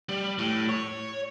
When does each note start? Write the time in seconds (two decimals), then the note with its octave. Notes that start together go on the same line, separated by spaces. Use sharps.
0.09 G3
0.39 A2
0.69 C#5